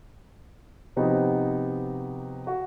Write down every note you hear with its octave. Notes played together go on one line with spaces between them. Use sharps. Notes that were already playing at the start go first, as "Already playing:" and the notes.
C3 F3 B3 D#4 F#4 G4
F#4